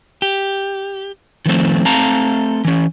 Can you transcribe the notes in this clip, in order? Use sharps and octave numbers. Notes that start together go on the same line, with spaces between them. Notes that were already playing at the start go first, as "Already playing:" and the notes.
G4
D#3 F3 A3 C4
A3 C4 F5 A5 A#5
E3 C#4